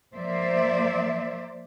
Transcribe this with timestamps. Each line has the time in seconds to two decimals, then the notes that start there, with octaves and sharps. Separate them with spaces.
0.14 F3 A#3 C5 D5 E5